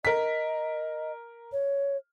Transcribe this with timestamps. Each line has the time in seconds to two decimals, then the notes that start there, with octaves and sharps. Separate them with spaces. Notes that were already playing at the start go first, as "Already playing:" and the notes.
0.05 A#4 D#5 B6
1.53 C#5